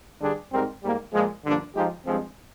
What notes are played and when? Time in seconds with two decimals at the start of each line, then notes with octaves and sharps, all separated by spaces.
0.21 G2 D3 G3 D4 G#4
0.52 G#2 G3 C4 D#4 A#4
0.83 G#2 G3 A#3
1.13 A#2 F3 G#3
1.45 G2 D3 F3 A#3 D4
1.75 F3 G#3 D#4 G4
2.05 G2 F3 G#3 C4